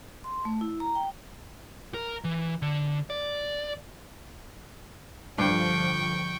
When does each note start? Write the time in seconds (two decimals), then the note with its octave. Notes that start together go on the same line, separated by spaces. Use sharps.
0.24 C6
0.45 A3
0.61 E4
0.80 A#5
0.95 G5
1.94 A#4
2.24 E3
2.62 D3
3.10 D5
5.38 G2 D3 F3 G5 C#6